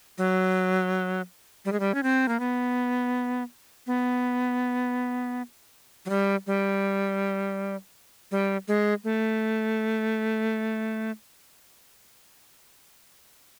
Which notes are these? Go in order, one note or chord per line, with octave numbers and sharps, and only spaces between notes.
F#3
G3
G#3
G3
C#4
C4
A#3
B3
B3
F#3
G3
G3
G3
G#3
A3